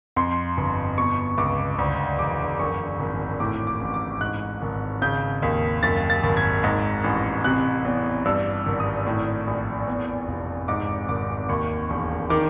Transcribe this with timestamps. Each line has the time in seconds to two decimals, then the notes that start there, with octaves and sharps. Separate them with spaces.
0.16 F2 C6
0.57 G1
0.98 B2 C#6
1.38 C#2 D6
1.79 D2
2.19 E1 D6
2.59 F#2 C#6
2.99 G#1
3.40 A2 D6
3.67 D6
3.81 A1
3.94 D6
4.20 G#2 F#6
4.62 G#1
5.02 C#3 G6
5.42 D#2
5.83 F#2 A6
6.10 A6
6.23 G#1
6.37 G#6
6.64 G#2
7.04 A1
7.44 C3 F#6
7.85 E2
8.25 G2 E6
8.66 G#1
8.80 D#6
9.07 A2
9.47 A#1
9.87 E2
10.28 F1
10.68 G#2 D6
11.08 G#1 D6
11.49 D#2 C#6
11.90 E1
12.30 D#3 D6